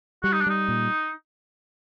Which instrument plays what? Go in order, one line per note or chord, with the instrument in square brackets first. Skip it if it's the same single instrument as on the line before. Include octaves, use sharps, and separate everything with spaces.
[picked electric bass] G3 [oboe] F#4
[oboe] D#4
D4
[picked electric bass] G3 [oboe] D#4
[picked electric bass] A#2